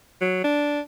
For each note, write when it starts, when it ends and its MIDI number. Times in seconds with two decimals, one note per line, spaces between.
0.21 0.43 54
0.44 0.80 62